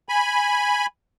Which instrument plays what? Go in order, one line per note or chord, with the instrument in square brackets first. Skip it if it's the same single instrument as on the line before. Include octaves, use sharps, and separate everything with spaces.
[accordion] G#5 B5